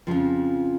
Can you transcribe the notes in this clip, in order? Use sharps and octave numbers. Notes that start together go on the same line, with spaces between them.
F2 C#3 F3